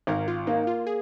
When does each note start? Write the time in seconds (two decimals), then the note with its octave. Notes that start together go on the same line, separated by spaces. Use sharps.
0.07 G#1 A#4
0.28 F4
0.47 A#3 D#4
0.67 F4
0.87 G#4